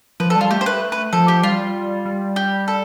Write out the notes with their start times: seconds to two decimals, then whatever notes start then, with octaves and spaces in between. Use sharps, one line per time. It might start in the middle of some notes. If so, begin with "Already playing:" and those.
0.20 F3 B4
0.30 A4
0.36 G3
0.41 F4
0.51 A3 G4
0.61 C5
0.66 B4
0.92 B4
1.13 F3 A4
1.28 G4
1.43 G3 F4
2.05 G3
2.36 G4
2.68 A4